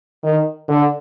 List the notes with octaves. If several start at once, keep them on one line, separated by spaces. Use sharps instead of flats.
D#3
D3